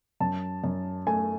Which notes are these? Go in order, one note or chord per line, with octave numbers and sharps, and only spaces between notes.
F#2 A5
F#2
A3 G#5